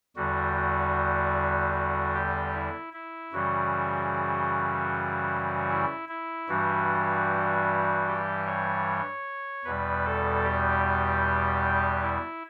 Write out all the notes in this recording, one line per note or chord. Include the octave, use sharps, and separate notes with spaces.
E2 D3 G3 F#4
F#4
F#4
G4
E4
E4
F#2 C#3 E3 G3 F#4
E4
E4
G2 E3 G3 F#4
G4
C#5
E2 B2 G3 B4
A4
G4
E4